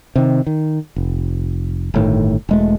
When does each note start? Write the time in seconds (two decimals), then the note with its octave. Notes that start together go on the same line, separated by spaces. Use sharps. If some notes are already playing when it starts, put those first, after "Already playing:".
0.16 C3 D#3
0.47 D#3
0.96 F1
1.94 G1 A2 D#3
2.49 E1 G#3 A3